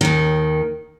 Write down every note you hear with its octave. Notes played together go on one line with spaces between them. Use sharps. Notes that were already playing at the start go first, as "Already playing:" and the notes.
D#2 D#3